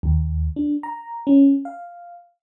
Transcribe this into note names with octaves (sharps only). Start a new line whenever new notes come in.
D#2
D4
A#5
C#4
F5